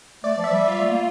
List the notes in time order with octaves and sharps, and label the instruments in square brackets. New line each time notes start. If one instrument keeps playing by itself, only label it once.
[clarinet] A3 [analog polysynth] D5
[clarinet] F3
[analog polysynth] E5
[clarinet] G3 [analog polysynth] D5
[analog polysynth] F4
[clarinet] A3
A#3